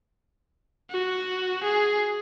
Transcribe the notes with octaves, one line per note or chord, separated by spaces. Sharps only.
F#4
G#4